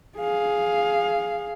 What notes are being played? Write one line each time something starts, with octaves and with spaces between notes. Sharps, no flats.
G#4 F5